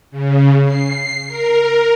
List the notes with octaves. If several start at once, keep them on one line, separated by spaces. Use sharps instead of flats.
C#3
C7
A#4